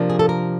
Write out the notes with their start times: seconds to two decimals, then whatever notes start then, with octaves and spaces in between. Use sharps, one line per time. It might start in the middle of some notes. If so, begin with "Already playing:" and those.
Already playing: C3 F3 A#3 D4
0.10 G#4
0.19 A4
0.29 A#4